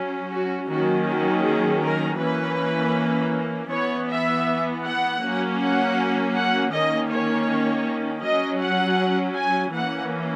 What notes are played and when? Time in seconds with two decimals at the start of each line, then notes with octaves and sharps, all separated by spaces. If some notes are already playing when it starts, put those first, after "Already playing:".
Already playing: F#3 C#4
0.31 F#4
0.68 D#3 F#3 A#3 C#4 F#4
1.07 F#4
1.44 G#4
1.82 A#4
2.19 E3 A#3 C#4 B4
3.71 E3 B3 C#5
4.09 E5
4.84 F#5
5.22 F#3 A#3 C#4
5.59 F#5
6.34 F#5
6.71 D#3 A#3 C#4 D#5
7.10 C#5
8.22 F#3 C#4 D#5
8.60 F#5
9.36 G#5
9.73 E3 A#3 C#4 F#5